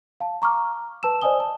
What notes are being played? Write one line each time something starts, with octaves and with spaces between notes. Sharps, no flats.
F5 A5
A#5 C#6 D6 F6
B4 A5 E6 E7
C5 D5 D#5 G#5 D#6 G7
A5